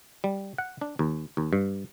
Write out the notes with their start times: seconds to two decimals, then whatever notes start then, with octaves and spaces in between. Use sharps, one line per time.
0.24 G3
0.58 F#5
0.81 D4
0.99 D#2
1.37 D#2
1.53 G2